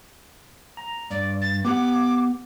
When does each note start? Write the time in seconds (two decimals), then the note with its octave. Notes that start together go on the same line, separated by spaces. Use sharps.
0.77 A#5
1.10 G2 D5
1.41 A6
1.65 B3 G4 F#5 D6